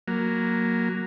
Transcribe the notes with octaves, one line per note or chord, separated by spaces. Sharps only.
F#3 A#3